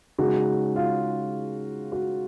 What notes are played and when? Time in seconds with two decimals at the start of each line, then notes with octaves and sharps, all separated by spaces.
0.18 C#3 G#3 D#4 F#4
0.76 F4
1.92 F#4